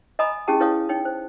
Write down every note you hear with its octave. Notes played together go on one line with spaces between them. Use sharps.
D#5 G#5 A#5 B5 D#6
C#4 E4 G4 G#4 G5 A5
E4 G#4 B4 C#5 F5 D#6
D#4 C#5 G5
C5